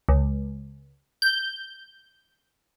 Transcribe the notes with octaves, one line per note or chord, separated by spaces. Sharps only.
C#2
G6